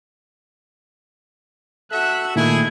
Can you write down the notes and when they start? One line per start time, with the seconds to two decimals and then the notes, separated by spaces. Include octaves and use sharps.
1.92 F#4 A4 E5 F#6
2.36 A#2 D#3 A3 E4 G#4 G#6